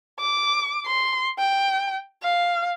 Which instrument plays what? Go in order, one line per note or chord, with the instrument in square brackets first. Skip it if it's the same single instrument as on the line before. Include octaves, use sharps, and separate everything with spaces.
[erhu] D6
C6
G5
F5